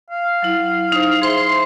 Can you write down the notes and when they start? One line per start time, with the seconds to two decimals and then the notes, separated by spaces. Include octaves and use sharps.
0.10 F5
0.42 F#3 E4
0.92 D#4 C5
1.22 G#4 C5 E5 C6